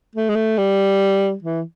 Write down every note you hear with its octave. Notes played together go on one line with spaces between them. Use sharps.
A3
G#3
A3
G3
E3